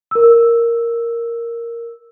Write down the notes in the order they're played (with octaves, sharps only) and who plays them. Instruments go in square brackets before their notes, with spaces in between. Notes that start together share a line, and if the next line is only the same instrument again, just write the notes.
[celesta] A#4 E6